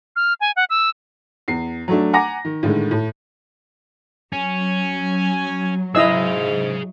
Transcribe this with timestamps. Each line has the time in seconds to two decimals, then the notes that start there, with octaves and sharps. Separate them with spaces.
0.16 F6
0.41 G#5
0.56 F#5
0.70 E6
1.48 E2 C7
1.88 F#3 A3 D4
2.13 F#5 G#5 A#5 D6 A#6
2.45 D#3
2.63 A2 D3 D#3 G#3
2.91 A2
4.33 F#3 C#4 G#5
5.95 G#2 E4 G#4 D#5 F5 E6